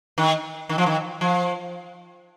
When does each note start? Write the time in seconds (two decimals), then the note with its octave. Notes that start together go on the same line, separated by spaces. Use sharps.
0.18 D#3
0.69 D#3
0.78 F3
0.86 D#3
1.21 F3